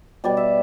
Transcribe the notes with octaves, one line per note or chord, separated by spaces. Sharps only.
B2 G3 D5
E5